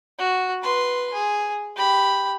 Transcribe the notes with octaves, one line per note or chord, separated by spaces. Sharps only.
F#4
B4 C6
G#4
G4 B5